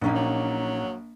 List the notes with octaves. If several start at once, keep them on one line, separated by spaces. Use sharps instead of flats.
A#1 A#2 A#3 C#4 D#4
F#3